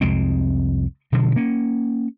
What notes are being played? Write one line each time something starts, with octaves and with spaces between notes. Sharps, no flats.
C2 F2 G#3 C4
B2 D3 F3 F#3
A#3 C#4